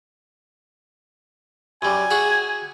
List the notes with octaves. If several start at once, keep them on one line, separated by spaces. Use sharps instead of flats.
F#2 G3 G#5
F#4 G#4 E5